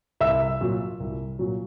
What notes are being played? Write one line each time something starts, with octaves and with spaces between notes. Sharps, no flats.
C2 E5 E6
A#2 F#3
C2
A#2 F#3